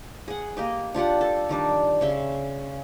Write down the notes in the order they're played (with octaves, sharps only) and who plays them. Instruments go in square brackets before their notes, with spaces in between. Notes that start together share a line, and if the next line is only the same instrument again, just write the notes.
[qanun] G#4 F#5
A#3 G4 D#5
D4 F4 G4 F#5
A4
D#3 G3 D4
C#3 E5 C6